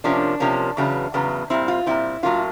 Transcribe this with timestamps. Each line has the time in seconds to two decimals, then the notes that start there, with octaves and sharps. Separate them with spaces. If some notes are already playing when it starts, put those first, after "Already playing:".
0.04 C3 F3 A#3 C#4 D4
0.40 C3 F3 A#3 C#4
0.77 E2 C#3 F#3 B3
1.14 E2 C#3 F#3 B3
1.50 A#2 G3 C4 E4
1.68 F4
1.86 A#2 G3 C4 E4
2.23 A2 F#3 A#3 C#4 F4